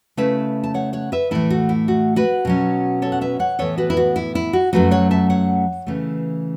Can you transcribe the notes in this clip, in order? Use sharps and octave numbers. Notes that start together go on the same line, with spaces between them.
C#3 A3 E4 B4 E5
A5
C#5 F#5
C#5 F#5
B4 E5
A2 E3 A3 E4 A4
F#4
E4
F#4
F#4 B4
B2 F#3 C#4
A4 C#5
F#5
B4 E5
C#5 F#5
A2 E3 B3 A4 C#5
F#4 B4
E4
F#4
E4
E4
F#4
F#2 F#3 A3 F#4 B4
C#5 F#5
E5 A5
C#5 F#5
C#3 E3 A3